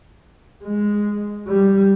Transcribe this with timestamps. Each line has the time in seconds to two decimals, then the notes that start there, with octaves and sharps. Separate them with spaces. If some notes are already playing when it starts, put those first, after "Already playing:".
0.64 G#3
1.47 G3